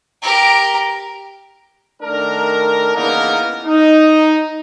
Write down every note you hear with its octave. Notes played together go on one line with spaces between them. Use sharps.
G4 A#4
D#3 A3 D4 A#4
C#3 E3 A#3 B3 D#4 A#4
D#4